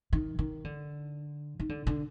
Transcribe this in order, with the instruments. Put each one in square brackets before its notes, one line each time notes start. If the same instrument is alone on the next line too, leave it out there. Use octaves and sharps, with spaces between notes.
[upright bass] D#3
D#3
D3
D#3
D3
D3